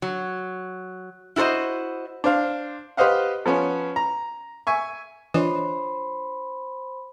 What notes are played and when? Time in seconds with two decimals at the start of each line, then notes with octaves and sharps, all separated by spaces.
0.02 F#3
1.36 E4 F#4 A4 C5 D#5
2.24 D4 C5 F5
2.97 G4 B4 C5 D#5 F5 F#5
3.46 F3 B3 C#4
3.96 A#5
4.67 E5 G#5 C#6
5.34 E3 D4 F4 C5 C#5 D#5 B5 C6